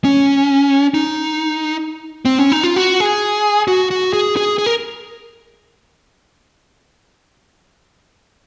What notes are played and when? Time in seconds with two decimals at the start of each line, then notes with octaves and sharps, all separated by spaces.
0.04 C#4
0.94 D#4
2.25 C4
2.39 C#4
2.52 D#4
2.64 F4
2.76 F#4
3.00 G#4
3.68 F#4
3.91 F#4
4.13 G#4
4.37 G#4
4.58 G#4
4.66 A#4